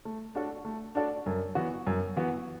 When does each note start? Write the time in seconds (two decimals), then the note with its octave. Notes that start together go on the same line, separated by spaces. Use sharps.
0.05 A3
0.35 D4 F#4 A4 D5
0.65 A3
0.95 D4 F#4 A4 D5
1.26 F#2
1.55 E3 B3 F#4
1.87 F#2
2.17 E3 B3 F#4